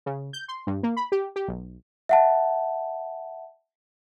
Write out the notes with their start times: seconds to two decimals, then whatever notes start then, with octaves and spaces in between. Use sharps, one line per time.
0.06 C#3
0.33 G6
0.48 C6
0.67 G2
0.83 A#3
0.97 B5
1.12 G4
1.36 G4
1.48 B1
2.09 E5 F#5 A5